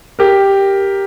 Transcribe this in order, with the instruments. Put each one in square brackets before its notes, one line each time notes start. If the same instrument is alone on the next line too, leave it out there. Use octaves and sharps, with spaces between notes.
[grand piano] G4 A#4